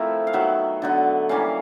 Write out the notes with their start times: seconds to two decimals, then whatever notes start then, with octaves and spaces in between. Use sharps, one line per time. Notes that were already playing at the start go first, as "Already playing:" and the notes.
Already playing: F3 A3 C4 E4 A#4
0.27 F5
0.33 D#3 F#3 B3 E5
0.82 D3 F#3 B3
1.29 E3 G3 A#3 C#4 F5